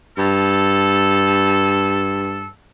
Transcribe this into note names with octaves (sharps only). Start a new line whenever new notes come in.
G2 A4